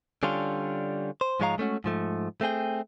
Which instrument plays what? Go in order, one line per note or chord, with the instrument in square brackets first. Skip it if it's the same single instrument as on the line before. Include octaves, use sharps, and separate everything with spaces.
[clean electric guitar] D3 G3 C#4 D4 F4
C5
G#2 F3 G#3 C#5 F5 A#5
G#3 A3 C#4 F#4
G#2 F3 A3
A3 C4 G#4 G5